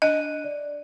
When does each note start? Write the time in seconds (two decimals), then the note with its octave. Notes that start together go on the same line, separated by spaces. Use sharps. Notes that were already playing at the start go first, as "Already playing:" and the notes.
0.02 D4 D#5 F#6 D#7
0.44 D5